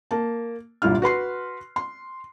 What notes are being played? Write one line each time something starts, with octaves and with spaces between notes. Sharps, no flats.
A#3 A5
G1 C2 A#2 E4 F4 F6
F#4 B4 C6 C7
C6